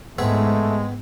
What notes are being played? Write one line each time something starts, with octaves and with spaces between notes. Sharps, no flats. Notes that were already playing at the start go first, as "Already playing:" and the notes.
G#2 G#3 A3 B3 C4 G#4